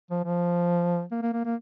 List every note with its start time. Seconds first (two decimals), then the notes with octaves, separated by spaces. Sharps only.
0.10 F3
0.24 F3
1.11 A#3
1.22 A#3
1.33 A#3
1.45 A#3